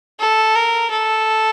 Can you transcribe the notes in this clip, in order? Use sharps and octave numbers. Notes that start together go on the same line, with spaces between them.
A4
A#4
A4